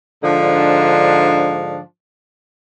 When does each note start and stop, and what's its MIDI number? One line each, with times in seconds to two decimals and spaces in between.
0.24 1.80 44
0.24 1.80 50
0.24 1.80 53
0.24 1.80 62